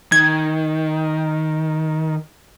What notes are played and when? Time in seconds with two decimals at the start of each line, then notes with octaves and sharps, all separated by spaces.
0.12 D#3 G#6